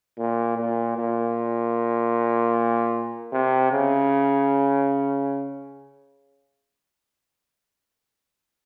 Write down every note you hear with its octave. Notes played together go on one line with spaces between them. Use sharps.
A#2
A#2
A#2
C3
C#3